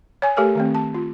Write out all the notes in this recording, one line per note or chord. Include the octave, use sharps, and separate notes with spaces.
C#5 G#5
A3 G4 A4 A#4 C#5 G#5
D#3 A3 C4
A5
F4